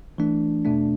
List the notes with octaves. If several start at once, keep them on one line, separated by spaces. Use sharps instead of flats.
E3 A3 D4
E2 B2 A3 D4